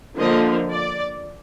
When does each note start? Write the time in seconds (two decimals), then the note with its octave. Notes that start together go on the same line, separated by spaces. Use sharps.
0.18 D3 F3 A#3 D#5
0.71 D5